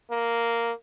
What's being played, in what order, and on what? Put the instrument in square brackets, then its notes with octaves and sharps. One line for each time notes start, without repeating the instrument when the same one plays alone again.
[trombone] A#3